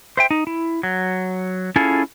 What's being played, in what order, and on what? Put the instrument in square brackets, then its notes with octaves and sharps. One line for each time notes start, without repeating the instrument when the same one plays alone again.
[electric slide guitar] C5 E5 G5
D#4
E4
F#3
C#4 E4 F4 G#4 A4